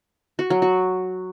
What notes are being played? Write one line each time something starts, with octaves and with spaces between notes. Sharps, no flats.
F#4
F#3
F#4